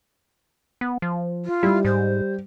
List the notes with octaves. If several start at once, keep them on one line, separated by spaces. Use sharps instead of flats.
B3
F3
F4
G3 E4
G#2 C5